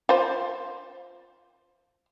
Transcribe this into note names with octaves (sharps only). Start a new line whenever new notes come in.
F4 C5